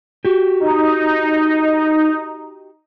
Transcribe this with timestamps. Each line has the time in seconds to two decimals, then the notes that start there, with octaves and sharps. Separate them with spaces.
0.25 F#4 G4
0.60 D#4